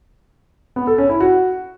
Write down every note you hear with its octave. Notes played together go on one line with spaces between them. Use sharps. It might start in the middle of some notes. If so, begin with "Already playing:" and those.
B3
A4
C#4
E4
F#4